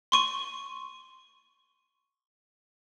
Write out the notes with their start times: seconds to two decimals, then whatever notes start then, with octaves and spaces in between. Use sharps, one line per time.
0.12 C6 C#6 D#7